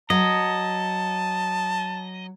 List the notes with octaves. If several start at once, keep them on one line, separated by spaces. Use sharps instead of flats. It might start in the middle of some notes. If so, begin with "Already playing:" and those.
F#3 D#5 A5